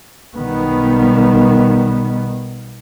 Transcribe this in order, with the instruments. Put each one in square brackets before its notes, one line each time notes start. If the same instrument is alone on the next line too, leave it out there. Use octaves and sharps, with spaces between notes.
[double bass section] B1 B2 D#3 G3 B3